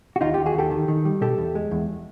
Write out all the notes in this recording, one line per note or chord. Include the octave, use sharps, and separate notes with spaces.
F#4
D#2 D#4 F4
F4 G4
D#2
F#4 G#4
D#2 G4 A4
D#3
D#3
G3
B2 G4 A4
E2
G#3
E2